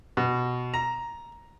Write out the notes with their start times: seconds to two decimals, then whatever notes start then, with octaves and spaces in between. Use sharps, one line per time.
0.17 B2
0.74 A#5